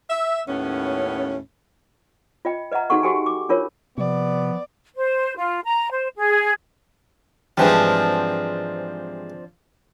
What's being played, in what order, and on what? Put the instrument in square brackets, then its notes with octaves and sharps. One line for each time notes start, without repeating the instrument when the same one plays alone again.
[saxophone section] E5
D#2 A2 B3 C#4
[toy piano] F4 D#5 G5
B4 D#5 E5 F#5 A#5
D#4 F#4 G#4 A4 F#5 C#6
F#4 G4 A4 G5 G#5
D6
D4 F4 A#4 C#5
[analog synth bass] C3 [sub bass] F3 [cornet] B3 [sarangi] D5
[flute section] C5
F4
A#5
C5
G#4
[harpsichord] G#2 E3 G3 [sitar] F3 C4 D4